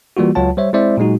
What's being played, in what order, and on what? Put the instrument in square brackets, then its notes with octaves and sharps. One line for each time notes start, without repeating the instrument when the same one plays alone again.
[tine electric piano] E3 G3 A#3 F4 F#4
C#2 F#3 F4 C#5 F#5 A5
G3 C5 C#5 E5
G#3 C4 E4 C5 D5 E5
A#2 F#3 G#3 D#4 F#4